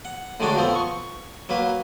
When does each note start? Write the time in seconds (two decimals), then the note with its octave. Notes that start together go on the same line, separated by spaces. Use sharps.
0.05 F#5
0.40 A2 D3 D#3 G#3 D4 F#4
0.56 F2 F3 B3 C4
0.75 C#6
1.49 F#3 A#3 B4